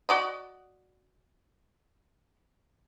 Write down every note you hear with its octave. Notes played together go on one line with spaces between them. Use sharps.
F#4 D5 D#5